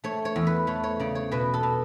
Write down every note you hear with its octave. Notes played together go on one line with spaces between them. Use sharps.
A3 C#5
C#5
E2
B4
A3 C#5
C#5
C#3 D5
C#5
B2 B4
A4
B2